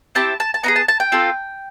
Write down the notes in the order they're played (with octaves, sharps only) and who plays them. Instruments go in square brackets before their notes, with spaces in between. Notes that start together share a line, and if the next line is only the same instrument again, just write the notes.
[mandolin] C4 E4 G4 A5
A5
A5
B3 D#4 G#4 A#5
A5
A5
G5
C4 F4 A4